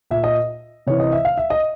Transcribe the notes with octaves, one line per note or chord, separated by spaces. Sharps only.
A#2 E5
D#5
C3 E3 C#5
D#5
E5
F5
E5
D#5